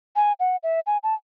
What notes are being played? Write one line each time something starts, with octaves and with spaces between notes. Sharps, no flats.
G#5
F#5
E5
G#5
A5